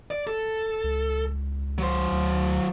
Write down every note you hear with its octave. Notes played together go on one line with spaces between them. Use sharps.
D5
A4
C#2
F#3 C5
D2